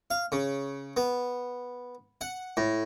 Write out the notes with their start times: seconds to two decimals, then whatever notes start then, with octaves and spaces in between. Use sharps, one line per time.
0.10 F5
0.32 C#3
0.97 B3
2.21 F#5
2.57 A2